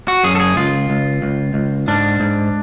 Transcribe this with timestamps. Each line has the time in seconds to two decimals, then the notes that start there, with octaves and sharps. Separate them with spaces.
0.08 F#4
0.24 F#2 G#4
0.35 A4
0.40 G#4
0.56 C#2 F4
0.90 C#2
1.22 C#2
1.54 C#2
1.88 G#2 D4
2.20 G#2